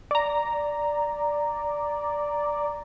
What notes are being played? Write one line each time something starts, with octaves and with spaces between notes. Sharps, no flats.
D5 A#5